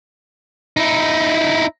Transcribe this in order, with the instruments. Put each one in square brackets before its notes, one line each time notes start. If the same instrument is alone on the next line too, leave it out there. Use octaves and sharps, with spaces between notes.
[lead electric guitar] D#4 E4